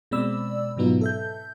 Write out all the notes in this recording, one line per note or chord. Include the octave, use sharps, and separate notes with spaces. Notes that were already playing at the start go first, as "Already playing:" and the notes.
B2 G#3 C4 D5 B5 E6
G#2 B2 F#3 B3 D#4 F4
A4 E5 G6